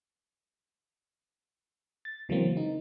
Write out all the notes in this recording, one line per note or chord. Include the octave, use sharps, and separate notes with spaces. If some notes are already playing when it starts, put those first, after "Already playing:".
A6
C#3 E3 F#3 G#3 A#3 C4
D#4